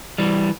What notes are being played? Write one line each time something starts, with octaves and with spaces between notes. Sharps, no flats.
E3 G3